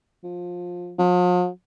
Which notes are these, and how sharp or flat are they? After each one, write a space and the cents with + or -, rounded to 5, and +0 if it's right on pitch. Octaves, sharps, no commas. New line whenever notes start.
F3 +20
F3 +45